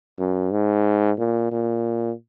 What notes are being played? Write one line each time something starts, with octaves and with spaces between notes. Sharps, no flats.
F#2
G#2
A#2
A#2